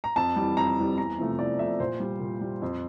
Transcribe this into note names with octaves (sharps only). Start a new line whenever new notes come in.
A#5
F2 A5
E3 G3
F2 A#5
E3 G3
E2 A#5
C3 F3 A3
E2 D5
C3 F3 A3 E5
A#2 C5
G3
A#2
G3
F2